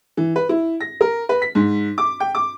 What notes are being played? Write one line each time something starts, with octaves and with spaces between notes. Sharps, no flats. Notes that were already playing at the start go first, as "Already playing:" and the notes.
E3
B4
E4
A#6
A#4
B4
B6
G#2
D6
G5
D6